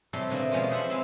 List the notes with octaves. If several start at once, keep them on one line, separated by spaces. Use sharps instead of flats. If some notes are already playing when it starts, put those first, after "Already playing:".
A2 C3 G3 A4 C6
B2 D3 A3 A#3 D4
B2 F3 G#3 C#4 F4
F2 C5 E5 F#5
C4 E4 F5 G#5